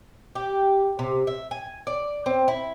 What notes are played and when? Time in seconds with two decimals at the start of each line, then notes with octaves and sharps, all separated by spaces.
0.35 G4
0.99 C3
1.27 E5
1.51 G#5
1.87 D5
2.26 C4
2.48 E4